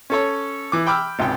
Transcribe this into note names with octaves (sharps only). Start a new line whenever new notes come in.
C#4 A4 C#5
E3 D6
G5 B5 D6 E6 F6
G#1 C#2 C3 G5